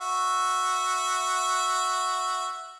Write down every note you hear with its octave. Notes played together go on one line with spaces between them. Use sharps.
F#4 E5